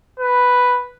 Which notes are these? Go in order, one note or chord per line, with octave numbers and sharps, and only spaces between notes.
B4